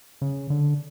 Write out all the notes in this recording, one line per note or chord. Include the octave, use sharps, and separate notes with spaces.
C#3
D3